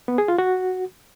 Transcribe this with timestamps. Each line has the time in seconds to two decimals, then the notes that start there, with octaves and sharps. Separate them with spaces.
0.08 B3
0.18 G#4
0.28 F4
0.38 F#4